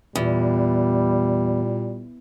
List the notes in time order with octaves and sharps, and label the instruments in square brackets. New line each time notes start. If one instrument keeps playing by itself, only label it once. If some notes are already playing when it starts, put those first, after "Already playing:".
[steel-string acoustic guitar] E2 [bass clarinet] A#2 [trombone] G3